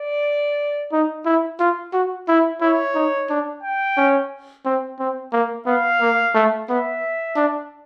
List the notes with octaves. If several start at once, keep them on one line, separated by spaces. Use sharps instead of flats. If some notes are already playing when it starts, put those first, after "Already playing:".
Already playing: D5
D#4
E4
F4
F#4
E4
E4 C#5
D#4
D4
G5
C#4
C4
C4
A#3
B3 F5
A#3
A3
B3 E5
D4